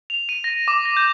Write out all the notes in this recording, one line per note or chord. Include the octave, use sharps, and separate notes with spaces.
F7
D#7
A#6
D6
A#6
G6